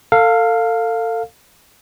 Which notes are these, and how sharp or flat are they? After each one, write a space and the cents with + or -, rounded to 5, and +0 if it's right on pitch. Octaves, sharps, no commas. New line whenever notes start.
A4 +35 F5 +5